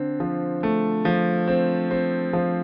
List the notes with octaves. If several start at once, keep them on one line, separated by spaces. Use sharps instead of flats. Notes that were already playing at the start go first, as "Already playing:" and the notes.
Already playing: D3 C4
F3
A3
F3
C4
C4
F3